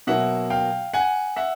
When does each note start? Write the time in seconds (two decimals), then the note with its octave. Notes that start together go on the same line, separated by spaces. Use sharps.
0.07 B2 F#3 A#3 E5 F#5
0.50 F5 G5
0.94 F#5 G#5
1.36 E5 F#5